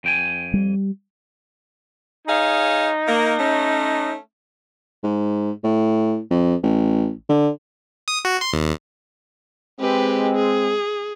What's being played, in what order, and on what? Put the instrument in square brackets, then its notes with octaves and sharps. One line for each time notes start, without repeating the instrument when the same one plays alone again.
[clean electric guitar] F2 G5 G#5
[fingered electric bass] G3
[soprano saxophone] D#4 [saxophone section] G#4 C#5 F5
[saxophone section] A#3
A3 C#4
[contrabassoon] G#2
A2
F2
A1
D3
[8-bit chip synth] D#6
F#4
C6
D#2
[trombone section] G#3 C4 [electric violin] G4 B4
[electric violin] G#4